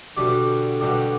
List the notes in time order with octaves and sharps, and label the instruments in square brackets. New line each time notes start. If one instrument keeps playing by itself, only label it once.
[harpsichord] B2 G3 D4 G4 D5 [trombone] D3
[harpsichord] B2 G3 D4 G4 D5